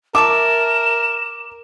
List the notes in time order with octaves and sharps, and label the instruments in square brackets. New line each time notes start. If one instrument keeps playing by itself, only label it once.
[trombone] A#4 [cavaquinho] E5 A5 C#6 [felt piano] D6 [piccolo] E7